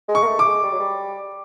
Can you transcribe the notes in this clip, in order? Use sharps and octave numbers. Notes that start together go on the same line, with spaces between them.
G#3
C#6
A#3
A3
D6
G#3
G3
F#3
G3